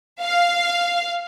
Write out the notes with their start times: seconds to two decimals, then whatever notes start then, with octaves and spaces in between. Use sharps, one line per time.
0.22 F5